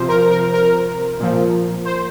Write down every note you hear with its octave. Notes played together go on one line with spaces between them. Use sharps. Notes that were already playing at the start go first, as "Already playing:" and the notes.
Already playing: C3 F3 C5
A#4
A#4
A#4
A#2 F3
C5